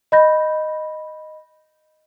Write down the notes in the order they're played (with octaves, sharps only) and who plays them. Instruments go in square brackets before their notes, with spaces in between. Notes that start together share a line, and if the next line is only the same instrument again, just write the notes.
[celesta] D#5 B5 G6 A#6